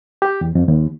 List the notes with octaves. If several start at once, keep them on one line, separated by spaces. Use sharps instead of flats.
G4
E2
F2
D#2